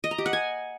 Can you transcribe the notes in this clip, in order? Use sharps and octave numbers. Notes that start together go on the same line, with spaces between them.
D#5
A#5
G4
F#5
G#5